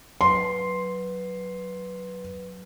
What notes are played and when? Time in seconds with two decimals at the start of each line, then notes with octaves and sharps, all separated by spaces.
0.21 F#3 B4 C6